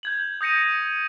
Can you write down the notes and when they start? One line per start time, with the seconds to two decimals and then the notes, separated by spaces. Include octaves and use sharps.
0.03 G6 G#6 F#7
0.41 D#6 G6 A#6 C#7 D#7